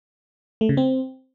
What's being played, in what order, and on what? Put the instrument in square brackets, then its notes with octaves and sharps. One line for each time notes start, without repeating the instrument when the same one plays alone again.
[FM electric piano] A3
C#3
C4